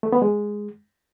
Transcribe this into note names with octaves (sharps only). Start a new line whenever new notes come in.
A3
B3
G#3